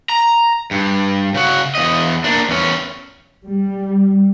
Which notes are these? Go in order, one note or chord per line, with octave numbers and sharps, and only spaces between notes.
A#5
G2
C#3 F#4
E2 D#5
A#3 D4
E2 C#4
G3